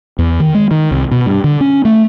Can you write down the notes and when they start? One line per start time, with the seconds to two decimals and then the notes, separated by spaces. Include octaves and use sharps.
0.19 E2
0.40 D#3
0.55 G#3
0.71 D#3
0.91 C2
1.11 B2
1.26 G2
1.44 D3
1.61 C#4
1.85 A3